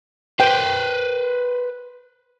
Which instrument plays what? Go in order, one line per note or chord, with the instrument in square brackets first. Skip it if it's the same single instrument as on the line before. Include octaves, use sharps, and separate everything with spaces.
[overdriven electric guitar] B4 C5 [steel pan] G5